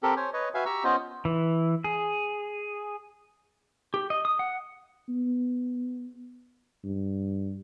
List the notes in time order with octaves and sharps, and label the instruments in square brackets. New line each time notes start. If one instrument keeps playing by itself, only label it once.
[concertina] C4 G4 A4 A#4
C5 C#5 G#5
B4 C#5 D#5
F#4 B4 E5 F5 G#5
G4 A#5 C#6 E6
B3 C#4 F4 C5 D#5
[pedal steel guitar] E3
G#4
G4
D#5
D#6
F#5
[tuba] B3
G2